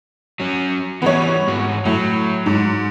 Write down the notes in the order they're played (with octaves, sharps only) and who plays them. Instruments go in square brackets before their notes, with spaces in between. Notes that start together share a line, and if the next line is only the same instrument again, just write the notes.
[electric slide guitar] F#3 C#4
[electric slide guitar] E3 G3 [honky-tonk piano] B3 C#5
[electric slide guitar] G#2 F#4
[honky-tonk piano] A2 [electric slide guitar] F#3
[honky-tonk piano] G#2